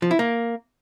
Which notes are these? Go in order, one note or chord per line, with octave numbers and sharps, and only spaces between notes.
F3
E4
A#3